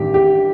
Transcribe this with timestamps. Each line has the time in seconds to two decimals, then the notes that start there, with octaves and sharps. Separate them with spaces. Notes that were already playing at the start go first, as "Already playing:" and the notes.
Already playing: A1 G2 D#3 G4
0.14 G4